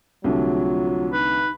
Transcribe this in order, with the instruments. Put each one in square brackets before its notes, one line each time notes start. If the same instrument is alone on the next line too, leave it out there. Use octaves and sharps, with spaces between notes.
[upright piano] C2 D3 A3 [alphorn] F#3 [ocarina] F4
[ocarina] D#4 [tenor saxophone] B4